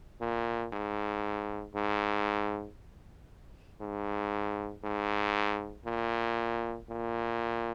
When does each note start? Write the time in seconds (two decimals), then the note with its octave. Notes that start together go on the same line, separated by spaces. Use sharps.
0.21 A#2
0.73 G#2
1.75 G#2
3.81 G#2
4.84 G#2
5.85 A#2
6.89 A#2